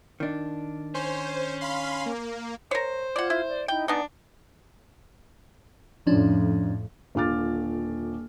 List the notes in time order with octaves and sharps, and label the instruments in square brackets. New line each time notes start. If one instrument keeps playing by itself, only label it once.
[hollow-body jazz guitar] D#3 D4
[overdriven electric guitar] C#4 [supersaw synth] C5
[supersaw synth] F5 B5 C6
A#3
[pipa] A#4 C#5 [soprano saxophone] C5
[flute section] F4 G#6 [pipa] D5 F#5
[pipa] E4
[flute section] D5
[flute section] D#4 E4 D#5 [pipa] G5
[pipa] B3 D#4 [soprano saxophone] D4 [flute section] D5 F#5 G#5
[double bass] F2 A2 [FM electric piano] F3 C#4 D4
[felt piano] D#1 D3 F4 D6 F6 A6